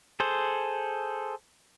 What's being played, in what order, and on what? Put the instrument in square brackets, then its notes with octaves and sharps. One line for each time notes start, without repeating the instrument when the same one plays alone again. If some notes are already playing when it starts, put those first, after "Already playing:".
[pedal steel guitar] G#4 A4 C5